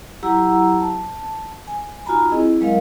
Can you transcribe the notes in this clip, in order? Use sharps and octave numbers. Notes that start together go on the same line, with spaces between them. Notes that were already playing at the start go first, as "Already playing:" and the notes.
F#3 E4 G4 F#5 A#5 E6
A5
G#5
D#4 F4 F#4 G#5 A#5 B5
C4 E4 G#4 D#5
F#3 G#3 A#4 D#5 F5